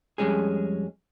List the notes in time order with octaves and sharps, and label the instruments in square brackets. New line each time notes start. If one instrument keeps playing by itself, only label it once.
[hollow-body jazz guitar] F2 G3 G#3 C#4 G#4